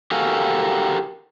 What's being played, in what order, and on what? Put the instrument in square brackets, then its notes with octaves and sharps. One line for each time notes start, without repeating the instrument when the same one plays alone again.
[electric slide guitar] F#4 G4 A4 A#4 F5 G#5